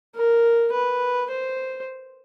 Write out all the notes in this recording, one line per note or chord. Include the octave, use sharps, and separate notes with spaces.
A#4
B4
C5